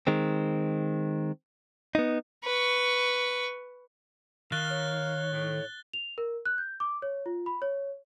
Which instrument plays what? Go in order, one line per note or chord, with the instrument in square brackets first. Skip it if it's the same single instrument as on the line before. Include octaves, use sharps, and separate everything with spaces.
[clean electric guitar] D#3 G#3 C4
B3 D#4
[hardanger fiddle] B4 C#6
[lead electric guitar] D#3 [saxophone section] A#4 F5 [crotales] F#6 A6 G7
[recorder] C#5
[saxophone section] A2
[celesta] F7
A#4
F#6
G6
D6
C#5
F4
B5
C#5